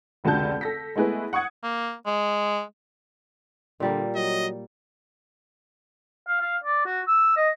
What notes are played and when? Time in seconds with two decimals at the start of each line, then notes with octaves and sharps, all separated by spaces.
0.24 F1 C#2 D3 F#4 A5 G6
0.61 A4 A#6 B6
0.95 G#3 A3 B3 E4 G#4 B4
1.33 F#5 C#6 D#6 G#6 C#7
1.63 A#3
2.06 G#3
3.80 A#2 D3 G3 A#3
4.15 F#3 D#5
6.28 F5
6.41 F5
6.64 D5
6.86 F#4
7.08 E6
7.37 D#5